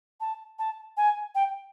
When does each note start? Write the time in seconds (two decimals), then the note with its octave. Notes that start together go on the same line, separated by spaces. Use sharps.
0.20 A5
0.59 A5
0.97 G#5
1.35 G5